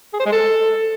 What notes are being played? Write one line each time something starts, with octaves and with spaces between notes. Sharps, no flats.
G#4
C5
G#3
A4